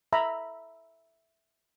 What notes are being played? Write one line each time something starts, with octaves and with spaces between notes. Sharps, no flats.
E5 A#5 B5